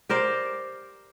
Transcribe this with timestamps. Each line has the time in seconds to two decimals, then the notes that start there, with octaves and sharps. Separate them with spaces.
0.09 G4 A#4 C5 D5